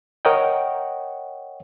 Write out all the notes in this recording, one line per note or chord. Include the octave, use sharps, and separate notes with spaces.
A#4 C#5 D#5 F#5 G5